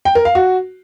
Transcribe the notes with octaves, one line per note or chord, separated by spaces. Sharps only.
G5
A#4
F5
F#4